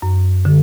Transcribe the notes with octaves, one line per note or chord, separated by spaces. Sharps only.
F#2
D3